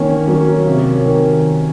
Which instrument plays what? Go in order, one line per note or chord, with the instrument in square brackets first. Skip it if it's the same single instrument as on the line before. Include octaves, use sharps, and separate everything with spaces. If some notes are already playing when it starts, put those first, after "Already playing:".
Already playing: [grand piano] D#3 C4 [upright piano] A#3 C#4
[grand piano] F#3
C3
D#3